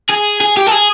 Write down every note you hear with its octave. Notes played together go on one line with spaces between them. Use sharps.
G#4
G#4
G4
A4
G#4